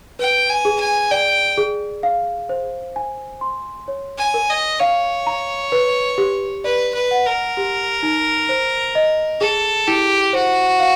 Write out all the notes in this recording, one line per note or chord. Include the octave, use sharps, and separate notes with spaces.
B4 G5
G#5
G#4
G#5
D5 G5
G#4
F5
C5
G#5
C6
C#5
G#5
A#4
D#5
C#5 F5
A#5
B4
G4
B4 D5
B4
F#5
A#4
G4
D#4
C5
D#5
G#4 A4
E4 G4
F#4 C5
F5